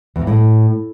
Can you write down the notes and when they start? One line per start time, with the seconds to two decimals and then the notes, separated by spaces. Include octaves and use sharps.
0.16 E2
0.22 A#2
0.27 A2